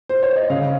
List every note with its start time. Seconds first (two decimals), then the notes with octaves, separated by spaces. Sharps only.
0.09 C5
0.23 C#5
0.36 D#5
0.50 C#3 F5